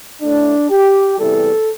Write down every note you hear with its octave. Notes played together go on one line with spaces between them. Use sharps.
A2 A3 D4
G4
E2 C3 E3 G3 A4